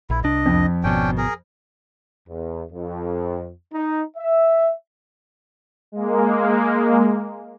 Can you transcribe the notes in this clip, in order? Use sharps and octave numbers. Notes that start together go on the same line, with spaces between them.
A#1 E4
C2 D4 D#5
F2
G#1 B2 C#4 D4 G5
G#4 A#4
E2
F2
D#4
E5
G#3 A#3